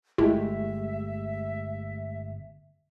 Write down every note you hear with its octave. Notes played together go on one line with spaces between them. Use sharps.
G1 G#3 A3 E4 G4 E5